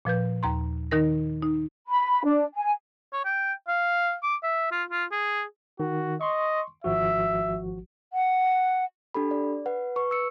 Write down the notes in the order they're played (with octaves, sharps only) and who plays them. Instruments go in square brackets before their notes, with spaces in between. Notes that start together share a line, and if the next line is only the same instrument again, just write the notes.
[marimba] A#2 F3 B4 G6
D#2 A#5 C6
D#3 D#4 A#4 A#6
D#4
[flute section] B5
D4
G#5
[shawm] C#5
G5
F5
D6
E5
F4
F4
G#4
[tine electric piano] D#3 [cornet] F#4
[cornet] D#5 [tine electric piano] C6 C#6
[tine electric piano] G#1 F3 F#4 [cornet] E5
[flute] F#5
[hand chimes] D4 G4 A4 B5
D5
B4 F#5
B4 C#6
E6 C#7